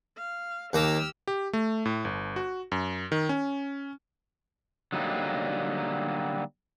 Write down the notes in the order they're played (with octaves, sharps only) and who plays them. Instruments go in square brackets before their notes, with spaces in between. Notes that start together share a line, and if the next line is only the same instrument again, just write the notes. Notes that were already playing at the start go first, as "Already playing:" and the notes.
[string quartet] F5
[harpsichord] D#2 A#3 A#5 [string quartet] G4 E6 F6
[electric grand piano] G4
A3
A2
G1
F#4
F#2
D#3
C#4
[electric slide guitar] D3 F#3 G3 A#3 D#4